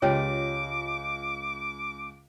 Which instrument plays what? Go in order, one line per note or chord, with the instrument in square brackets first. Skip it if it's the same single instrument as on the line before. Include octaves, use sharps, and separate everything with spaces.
[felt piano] C#2 [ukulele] F4 G4 D#5 [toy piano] C#5 [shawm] D6